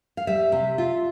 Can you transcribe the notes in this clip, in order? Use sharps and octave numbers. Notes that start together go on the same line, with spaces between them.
F5
G3 E5
C3
F4